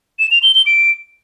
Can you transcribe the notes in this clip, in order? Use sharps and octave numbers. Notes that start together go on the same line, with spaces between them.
E7
F7
G7
G7
D7